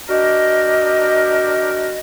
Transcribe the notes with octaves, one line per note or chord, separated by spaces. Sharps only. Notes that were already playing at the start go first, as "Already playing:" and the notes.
D4 F#4 G4 A#4 D#5